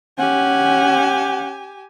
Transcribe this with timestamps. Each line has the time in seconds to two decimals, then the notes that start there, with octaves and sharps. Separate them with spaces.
0.18 C#4 G4 F#5 G#5